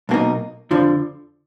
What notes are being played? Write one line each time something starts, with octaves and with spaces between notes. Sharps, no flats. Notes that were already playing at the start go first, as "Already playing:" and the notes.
B1 B2 A#3 D#4
F2 D3 F3